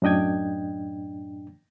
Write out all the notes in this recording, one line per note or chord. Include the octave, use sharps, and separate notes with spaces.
F#2 A2 D4 D#5 G5 G#6